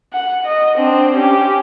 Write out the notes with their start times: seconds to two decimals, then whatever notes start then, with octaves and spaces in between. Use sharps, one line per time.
0.13 F#5
0.46 D#5
0.77 C4 D4
1.16 C#4 G4